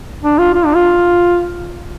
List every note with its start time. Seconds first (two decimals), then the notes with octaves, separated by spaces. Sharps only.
0.23 D4
0.38 F4
0.54 F4
0.65 D4
0.75 F4